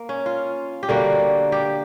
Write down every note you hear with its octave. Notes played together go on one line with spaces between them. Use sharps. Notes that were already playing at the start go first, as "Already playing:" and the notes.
Already playing: A#3
C#4
F4
G4
D3 G3 A#3 F#4
G4